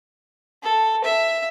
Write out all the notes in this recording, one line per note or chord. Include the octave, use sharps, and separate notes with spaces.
A4
E5